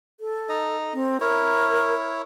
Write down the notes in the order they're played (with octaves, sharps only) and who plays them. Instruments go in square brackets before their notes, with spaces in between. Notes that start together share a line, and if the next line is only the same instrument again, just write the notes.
[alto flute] A4
[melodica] D#4 D#5
[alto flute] C4
[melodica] E4 C#5 [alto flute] A#4